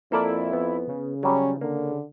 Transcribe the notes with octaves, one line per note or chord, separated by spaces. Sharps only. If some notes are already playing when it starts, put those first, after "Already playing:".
F2 A#3 E4 A4 D5
B3
C#3
F#3 G3 C#4
D3 A#3